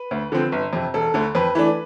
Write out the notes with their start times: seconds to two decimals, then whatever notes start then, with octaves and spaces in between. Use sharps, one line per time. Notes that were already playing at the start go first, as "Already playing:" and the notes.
Already playing: B4
0.11 D2
0.32 D3 F3 C4
0.52 G1
0.73 F2 C3
0.94 E1 A4
1.14 D2 D3
1.35 F2 B4
1.55 E3 A3 D4